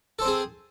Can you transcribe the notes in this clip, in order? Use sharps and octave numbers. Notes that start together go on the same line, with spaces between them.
C4 G#4 A4 C5